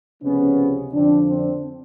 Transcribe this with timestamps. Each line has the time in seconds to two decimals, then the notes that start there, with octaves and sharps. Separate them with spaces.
0.22 C#2 C3 F3 G#3 B3 C#4
0.92 F2 D3 F3 C4 D4
1.27 C4 D4